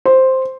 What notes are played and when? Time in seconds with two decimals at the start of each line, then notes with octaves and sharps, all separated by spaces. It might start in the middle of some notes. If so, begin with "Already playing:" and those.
0.05 C5